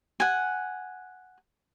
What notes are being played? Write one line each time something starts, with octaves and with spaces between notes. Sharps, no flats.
F#5 G#5